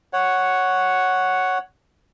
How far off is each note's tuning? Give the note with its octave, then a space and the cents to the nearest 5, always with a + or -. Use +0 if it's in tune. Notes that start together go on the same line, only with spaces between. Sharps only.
C#5 +0 F#5 +0